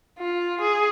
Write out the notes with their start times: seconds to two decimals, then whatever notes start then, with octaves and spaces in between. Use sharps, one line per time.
0.19 F4
0.61 G#4